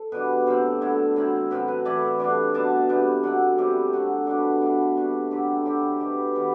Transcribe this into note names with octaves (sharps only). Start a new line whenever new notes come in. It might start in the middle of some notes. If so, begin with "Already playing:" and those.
Already playing: A4
B2 G3 D4 B4
A2 F#3 C4 C5
D3 A3 E4
F#3 C4 E4
A2 F#3 C4 B4
B4
E3 A3 E4 D5
D3 G3 D4 D5
B2 F#3 B3 D4 A5
C3 G3 B3 D4
B2 F#3 A3 C4 F#5
C3 G3 C4 E4 G4
D3 F#3 C4 F#4
B2 G3 D4 F#4
B2 A3 D4 E4
C3 G3 D4 F#4
D3 F#3 C4 E4 G4
A4
F#3 C4 E4 G4
B2 G3 B3 G4
E3 G3 B3